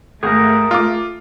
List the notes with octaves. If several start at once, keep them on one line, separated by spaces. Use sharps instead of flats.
G#1 A3 G#4 A#4
F4 D6